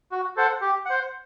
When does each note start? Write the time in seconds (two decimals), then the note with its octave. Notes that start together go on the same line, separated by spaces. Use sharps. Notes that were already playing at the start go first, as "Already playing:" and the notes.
0.11 F#4
0.36 A4 C5 F#5
0.61 G4
0.86 C5 F#5